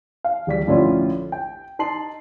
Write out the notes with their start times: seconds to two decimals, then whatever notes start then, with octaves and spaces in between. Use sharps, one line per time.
0.24 F5
0.47 D1 G3 B6
0.67 A#1 A2 D3 C#4 F4
1.32 G5
1.79 D#4 A5 C6 C7 F#7